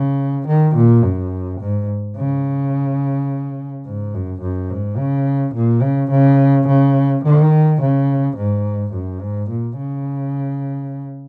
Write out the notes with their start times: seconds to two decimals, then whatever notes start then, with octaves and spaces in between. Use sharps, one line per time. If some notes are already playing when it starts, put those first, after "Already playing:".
Already playing: C#3
0.47 D#3
0.75 A#2
1.02 F#2
1.60 G#2
2.16 C#3
3.85 G#2
4.14 F#2
4.41 F#2
4.70 G#2
4.98 C#3
5.55 A#2
5.82 C#3
6.10 C#3
6.67 C#3
7.24 D#3
7.81 C#3
8.37 G#2
8.93 F#2
9.21 G#2
9.49 A#2
9.77 C#3